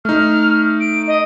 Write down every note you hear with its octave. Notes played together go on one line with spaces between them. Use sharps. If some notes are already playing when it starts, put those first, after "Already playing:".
A3 D#4 F6
D7
D#5